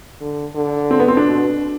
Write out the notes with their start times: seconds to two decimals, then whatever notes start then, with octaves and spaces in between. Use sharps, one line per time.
0.21 D3
0.55 D3
0.91 C4
1.00 B3
1.08 C4
1.17 D4
1.26 B2